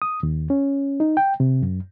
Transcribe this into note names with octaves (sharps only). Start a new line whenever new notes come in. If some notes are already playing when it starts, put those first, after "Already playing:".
D#6
D#2
C#4
D#4
G5
C3
F#2